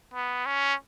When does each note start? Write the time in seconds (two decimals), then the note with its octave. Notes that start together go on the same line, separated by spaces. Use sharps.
0.14 B3
0.46 C#4